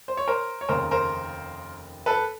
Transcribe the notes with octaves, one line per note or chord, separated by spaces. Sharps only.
C5
C#5
A#4 C5
C#5
F1 D#2 C#3 A#4 C5
A#4 C5
A4 B4